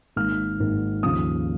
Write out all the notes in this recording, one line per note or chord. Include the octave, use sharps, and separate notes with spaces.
G#1 G#2 D#3 A#3 F6
G#1 G#2 D#3 A#3
D#2 C#3 F3 D#6